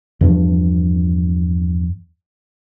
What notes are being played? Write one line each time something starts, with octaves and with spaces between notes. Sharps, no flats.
E2 G2 F3